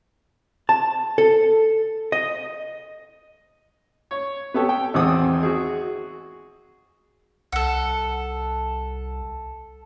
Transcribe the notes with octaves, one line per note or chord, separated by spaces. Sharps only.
A5
A4
D#5
C#5
B3 G4 A4 C#5
G5
G#1 E2 C4 F#5 D6 D#6
F#4 G#4
C2 A4 F#5